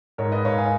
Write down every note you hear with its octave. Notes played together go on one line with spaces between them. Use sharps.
G#2 A#4 C#5
B4 D#5
G#2 C#5 F5
F5 G#5